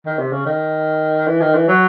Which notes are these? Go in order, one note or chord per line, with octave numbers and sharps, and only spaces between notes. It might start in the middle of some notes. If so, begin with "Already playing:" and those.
D#3
C3
C#3
D#3
E3
D#3
E3
F#3